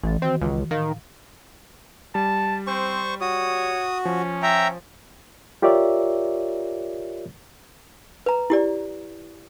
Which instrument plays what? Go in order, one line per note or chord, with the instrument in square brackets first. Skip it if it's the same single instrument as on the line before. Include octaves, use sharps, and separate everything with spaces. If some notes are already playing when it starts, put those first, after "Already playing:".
[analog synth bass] A1 [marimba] E3 A6
[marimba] D#3 F#4 [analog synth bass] C4
[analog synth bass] C#2
[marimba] A2 F5 [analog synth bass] D#3
[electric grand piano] G3 [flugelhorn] A5
[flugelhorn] C4 [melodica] C5 C#6
[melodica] F#4 [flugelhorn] C#5 [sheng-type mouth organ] D#6
[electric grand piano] F3 [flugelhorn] C#4
[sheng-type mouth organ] E5 G5 A#5
[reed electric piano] F4 G4 A#4 C#5 D5 E5
[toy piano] B4 A#5
E4 G4 D5